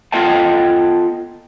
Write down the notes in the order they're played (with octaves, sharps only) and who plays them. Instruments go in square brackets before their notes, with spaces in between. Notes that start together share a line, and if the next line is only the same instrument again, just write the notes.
[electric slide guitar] B3 F4 A4 D#5 G5 A5